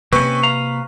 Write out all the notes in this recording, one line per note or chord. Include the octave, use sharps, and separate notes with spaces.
C3 A#3 C4 C#4 B4 C#6
F5 A#5